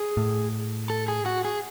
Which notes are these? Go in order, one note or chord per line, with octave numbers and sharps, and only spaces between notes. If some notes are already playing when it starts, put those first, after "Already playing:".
Already playing: G#4
A2
A4
G#4
F#4
G#4